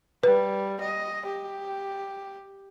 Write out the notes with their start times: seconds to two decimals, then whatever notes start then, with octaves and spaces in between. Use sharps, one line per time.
0.23 G3 B4
0.81 D#5
1.26 G4